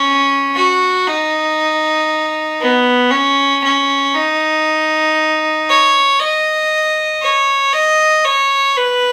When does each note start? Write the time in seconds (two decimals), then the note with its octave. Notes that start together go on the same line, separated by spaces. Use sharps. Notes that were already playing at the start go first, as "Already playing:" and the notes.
Already playing: C#4
0.55 F#4
1.07 D#4
2.61 B3
3.11 C#4
3.63 C#4
4.14 D#4
5.69 C#5
6.20 D#5
7.22 C#5
7.73 D#5
8.25 C#5
8.77 B4